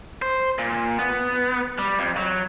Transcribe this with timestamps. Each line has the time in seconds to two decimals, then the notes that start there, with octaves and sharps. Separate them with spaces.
0.22 C5
0.58 A#2
0.99 B3
1.78 G3
1.99 F2
2.17 F#3